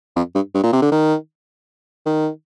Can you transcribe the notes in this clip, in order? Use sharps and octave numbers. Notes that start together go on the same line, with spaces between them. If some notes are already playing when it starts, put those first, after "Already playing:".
F2
G2
G2
A#2
C3
D3
D#3
D#3